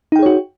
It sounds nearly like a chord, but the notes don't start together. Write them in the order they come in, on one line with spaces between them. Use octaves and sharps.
D#4 G5 G#4 C#5 F#4